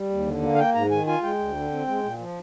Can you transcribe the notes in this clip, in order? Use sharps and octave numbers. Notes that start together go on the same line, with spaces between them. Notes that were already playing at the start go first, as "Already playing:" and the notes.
Already playing: G3
D#2
D3
A#3
F5
A#3 G5
G#2 A#5
D#3 G#5
F4 G#5
G#3 G5
D2
D3
C4
G#3
A#2
F3